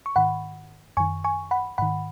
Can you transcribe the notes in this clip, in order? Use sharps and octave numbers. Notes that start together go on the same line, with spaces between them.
C#6
G#2 D#3 F#5 B5
F#2 D#3 G#5 C#6
G#5 C#6
F#5 B5
G#2 D#3 F#5 B5